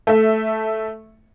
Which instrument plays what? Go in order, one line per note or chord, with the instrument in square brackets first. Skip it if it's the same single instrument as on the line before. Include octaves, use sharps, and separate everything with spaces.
[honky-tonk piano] A3 E5